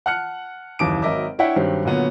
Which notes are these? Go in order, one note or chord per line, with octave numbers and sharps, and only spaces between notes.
F#5 A5 F6 F#6 C#7
F#1 D#2 E3 D6 D#6 D7
G#1 F#3 A#4 D#5 E5 D6
D4 E4 C#5 E5 F#5 G5
G2 D#3 F#3 C4 G4
A#2 D3 F#3 B3 C#4